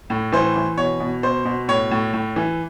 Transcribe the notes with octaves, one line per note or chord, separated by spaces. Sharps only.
A2
E3 C5
E3
B2 C#5
B2
B2 C5
B2
A2 C#5
A2
A2
E3